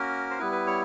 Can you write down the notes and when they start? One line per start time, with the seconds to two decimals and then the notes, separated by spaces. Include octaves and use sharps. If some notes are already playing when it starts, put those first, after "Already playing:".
Already playing: A#3 C#4 F#4 A#4
0.31 C5
0.39 G3 B3 E4 B4
0.52 B4
0.67 C#5